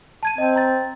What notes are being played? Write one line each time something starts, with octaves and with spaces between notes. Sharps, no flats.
A5 G#6 D#7
C4 D#5
A#5 A6